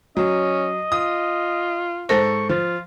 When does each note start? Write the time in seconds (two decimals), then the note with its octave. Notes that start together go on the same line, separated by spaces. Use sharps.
0.17 F#3 C#4 D#5
0.92 F4 D#6
2.09 G#2 A4 C5 C#6 A#6
2.49 F3 F4